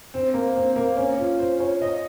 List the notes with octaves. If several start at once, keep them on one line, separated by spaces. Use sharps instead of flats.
C4
A#3
C4
A#3
C#4
F4
C5
C#5
D#5